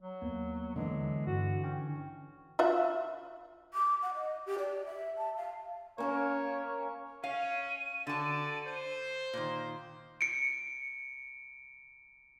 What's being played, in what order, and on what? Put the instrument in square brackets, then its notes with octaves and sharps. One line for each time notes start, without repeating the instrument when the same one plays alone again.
[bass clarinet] F#3
[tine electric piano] D#2 A#3 B3
[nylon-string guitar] D3 E3 [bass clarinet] G#3
[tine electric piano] G2 [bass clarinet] F#4
[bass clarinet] C#4 [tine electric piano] G5 G#5 C#6
[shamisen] F4 F#4 E5
[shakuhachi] D6
F#5
D#5
G4
D5
E5
A5
F5
[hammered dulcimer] A#3 C#4 A#4 [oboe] C#5
[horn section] C#4 [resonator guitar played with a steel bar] F5 [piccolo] D#7
[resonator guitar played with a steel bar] D3 A5 [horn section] F#4 A4 D5
[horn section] C5
[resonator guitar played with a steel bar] A#2 D#3
[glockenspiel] C#7 D7